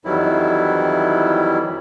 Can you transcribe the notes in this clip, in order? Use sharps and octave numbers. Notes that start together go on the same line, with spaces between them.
F2 D#3 E3 F#3 G3 E4